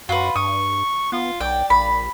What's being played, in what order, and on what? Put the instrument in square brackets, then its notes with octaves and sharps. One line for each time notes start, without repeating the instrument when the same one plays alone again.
[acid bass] F#2 [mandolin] F4 B4 [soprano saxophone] F#4
[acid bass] G2 [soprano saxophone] C#6 [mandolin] D#6
[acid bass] B3 [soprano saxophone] F4
[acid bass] B1 [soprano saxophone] D5 [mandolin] G5
[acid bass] A#1 [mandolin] B5